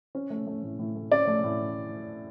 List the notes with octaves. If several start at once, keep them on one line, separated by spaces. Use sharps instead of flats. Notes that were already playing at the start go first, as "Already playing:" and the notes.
C#4
A3
A3
A2
A2
A3
C#4 D5
A3
A2